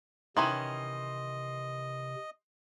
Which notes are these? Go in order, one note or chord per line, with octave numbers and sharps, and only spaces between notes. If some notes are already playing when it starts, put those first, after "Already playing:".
C3 D#3 E3 C#4 D#5 C6